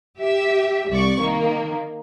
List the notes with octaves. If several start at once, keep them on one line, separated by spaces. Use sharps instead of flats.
G4 E5
C2 D5 C#6
D#3 A#3